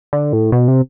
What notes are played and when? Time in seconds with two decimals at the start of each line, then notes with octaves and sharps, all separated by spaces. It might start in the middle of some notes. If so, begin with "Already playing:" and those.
0.13 D3
0.33 A2
0.52 B2
0.68 C3